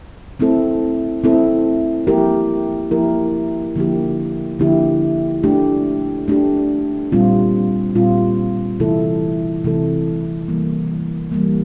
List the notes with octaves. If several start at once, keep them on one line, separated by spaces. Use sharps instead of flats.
A3 C4 E4 A4
A3 C4 E4 A4
F3 A#3 E4 G4 A#4
F3 A#3 E4 G4 A#4
D3 F3 A#3 E4 G4
D3 F3 A#3 E4 G4
A3 D4 G4
A3 D4 G4
A#2 G3 C4 F4
A#2 G3 C4 F4
C3 E3 A3 E4 A4
C3 E3 A3 E4 A4
E3 G3 A#3
E3 G3 A#3